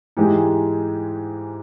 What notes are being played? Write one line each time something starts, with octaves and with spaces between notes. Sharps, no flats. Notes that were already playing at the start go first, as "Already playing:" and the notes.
G#2 E3 G#3 D#4 G4